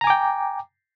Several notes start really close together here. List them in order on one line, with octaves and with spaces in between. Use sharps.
A#5 G#5 D6 G5